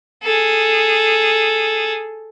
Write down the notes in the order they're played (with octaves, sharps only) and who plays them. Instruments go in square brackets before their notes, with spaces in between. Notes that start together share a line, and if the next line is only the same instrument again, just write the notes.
[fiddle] G#4 A4